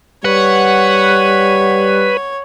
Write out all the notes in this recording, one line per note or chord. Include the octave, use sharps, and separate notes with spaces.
G3 B4 C#5 F#5